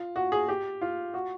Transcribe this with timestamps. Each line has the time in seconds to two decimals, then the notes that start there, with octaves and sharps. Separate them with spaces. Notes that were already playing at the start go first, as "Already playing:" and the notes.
Already playing: F4
0.16 F#4
0.32 G#4
0.49 G4
0.82 F4
1.14 F#4